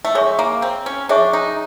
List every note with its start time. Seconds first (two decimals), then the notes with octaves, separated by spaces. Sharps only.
0.05 A3
0.15 G#3 G#4 C#5 E5 G#5 C#6
0.39 A#3
0.62 C4
0.86 C#4
1.09 D4 G#4 C#5 E5 G#5 C#6
1.33 D#4